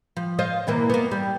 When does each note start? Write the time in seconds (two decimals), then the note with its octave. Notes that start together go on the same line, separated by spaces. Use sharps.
0.17 F3
0.39 F4 C5 D#5
0.67 B2 E3 A#3
0.90 A#3 B3
1.11 G3